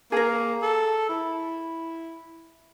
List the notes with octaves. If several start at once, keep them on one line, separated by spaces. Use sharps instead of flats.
A#3 G#4 A#4
A4
E4